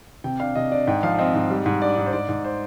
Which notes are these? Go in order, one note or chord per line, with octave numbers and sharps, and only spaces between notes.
C3 G5
D4 F5
C3 D#5
D4 D5
G#2 G5
F3 F5
C4 D#5
G#2
G3
G#2
D4 D5
G#2
C5
G#2 D5
G#2
C5